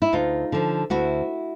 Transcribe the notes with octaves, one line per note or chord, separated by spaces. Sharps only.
E4
D2 D#4 F4
D3 F3
D2 E4 F#4